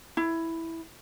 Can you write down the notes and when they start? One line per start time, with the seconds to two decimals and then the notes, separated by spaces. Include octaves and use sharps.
0.17 E4